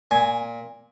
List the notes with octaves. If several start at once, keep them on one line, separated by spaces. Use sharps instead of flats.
A#2 G#5